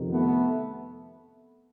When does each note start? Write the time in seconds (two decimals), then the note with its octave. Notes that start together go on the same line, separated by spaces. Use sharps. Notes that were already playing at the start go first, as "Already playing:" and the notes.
Already playing: F2 C3 D#3
0.11 A3 B3